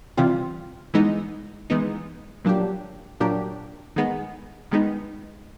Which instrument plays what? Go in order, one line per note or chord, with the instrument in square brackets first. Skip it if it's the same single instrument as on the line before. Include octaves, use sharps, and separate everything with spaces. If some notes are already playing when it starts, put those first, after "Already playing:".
[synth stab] C3 E3 G3 C4 F4
E3 G#3 B3 D#4
E3 G#3 B3 D#4
A#2 F#3 A#3 D4 G4
A#2 F#3 A#3 D4 G4
D#3 G#3 B3 D#4
D#3 G#3 B3 D#4